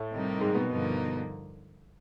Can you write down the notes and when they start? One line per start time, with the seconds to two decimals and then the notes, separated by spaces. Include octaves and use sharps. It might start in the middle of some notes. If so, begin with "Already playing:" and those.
Already playing: A2 A3
0.12 C3 D#3 G3 A#3 D#4
0.41 G#2 G#3
0.54 B2 B3
0.69 G2 D3 F3 A#3 D#4